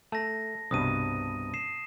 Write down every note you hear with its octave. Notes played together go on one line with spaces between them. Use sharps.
A3 A5 A#6
C2 G2 B2 D#6 D#7
C7 E7